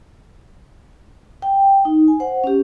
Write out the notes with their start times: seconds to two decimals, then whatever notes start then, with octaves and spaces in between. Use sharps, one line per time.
1.42 G5
1.85 D#4
2.08 G#5
2.20 C5 F#5
2.44 C#4 G4